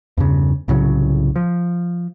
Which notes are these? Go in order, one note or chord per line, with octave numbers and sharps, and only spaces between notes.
E2 G2 C#3
C2 A2 C#3 F#3
F3